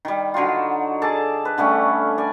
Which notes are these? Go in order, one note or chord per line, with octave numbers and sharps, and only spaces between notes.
D#3 G3
D3 F#3 D#4 F4
G#4 A4 D5 A5
B4
D3 G3 A3 C#4
D5 G#5